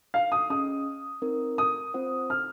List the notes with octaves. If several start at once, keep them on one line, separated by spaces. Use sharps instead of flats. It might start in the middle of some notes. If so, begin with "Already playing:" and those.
F5
D#6
C#4 G#4 D#5 D#6
C4 D#4 A#4
D#6
C4 F4 C5 F#5
F6